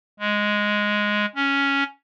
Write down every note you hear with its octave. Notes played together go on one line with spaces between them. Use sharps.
G#3
C#4